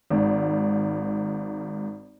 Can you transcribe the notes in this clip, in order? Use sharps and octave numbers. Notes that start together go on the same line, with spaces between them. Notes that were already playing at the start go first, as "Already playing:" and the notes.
G#1 G#2